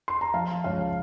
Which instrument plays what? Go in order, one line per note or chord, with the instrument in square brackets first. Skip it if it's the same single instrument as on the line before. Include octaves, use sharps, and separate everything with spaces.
[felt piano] C6
A#5
F3 F5 A5
C#2 C#5 F5